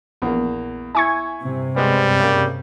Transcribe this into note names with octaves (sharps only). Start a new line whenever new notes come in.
A#1 E2 A#3 B3
E4 G#5 C#6 G#6
G2 C3
G3 G#3 B3 C4
C#3 A#3